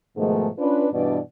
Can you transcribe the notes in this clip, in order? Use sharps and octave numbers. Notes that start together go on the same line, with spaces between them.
G#2 B2 D#3 F3 G#3 A3
C#4 D4 F4 B4
G2 B2 E3 D4 D5